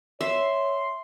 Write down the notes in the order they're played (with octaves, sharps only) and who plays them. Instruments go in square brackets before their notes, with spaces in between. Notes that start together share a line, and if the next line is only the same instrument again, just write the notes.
[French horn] C#5 [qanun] E5 [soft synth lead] C6